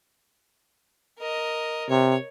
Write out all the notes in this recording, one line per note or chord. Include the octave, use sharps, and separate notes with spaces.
A#4 D#5
C3 C#5